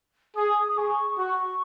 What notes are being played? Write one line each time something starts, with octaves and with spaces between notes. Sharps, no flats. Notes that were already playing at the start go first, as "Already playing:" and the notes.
G#4 D#6
D#6
G#4 C#6
F#4 C#6